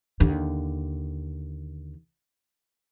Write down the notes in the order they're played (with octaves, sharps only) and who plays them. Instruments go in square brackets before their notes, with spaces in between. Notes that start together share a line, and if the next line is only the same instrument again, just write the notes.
[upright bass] D#2 D3